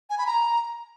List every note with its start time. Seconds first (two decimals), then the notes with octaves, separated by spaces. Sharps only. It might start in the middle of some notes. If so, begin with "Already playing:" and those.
0.10 G#5
0.18 B5
0.26 A#5